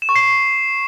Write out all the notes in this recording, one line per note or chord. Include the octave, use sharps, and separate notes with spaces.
E7
C#6
C7